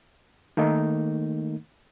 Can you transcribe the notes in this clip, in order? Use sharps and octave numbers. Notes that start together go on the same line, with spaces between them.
D#3 A3 A#3 D#4